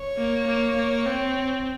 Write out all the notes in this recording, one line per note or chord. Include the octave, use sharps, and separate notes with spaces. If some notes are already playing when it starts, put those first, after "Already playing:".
Already playing: C#5
A#3
A#3
A#3
C4